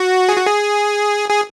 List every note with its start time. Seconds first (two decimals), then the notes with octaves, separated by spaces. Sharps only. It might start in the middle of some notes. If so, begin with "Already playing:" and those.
Already playing: F#4
0.29 G#4
0.37 F#4
0.46 G#4
1.29 G#4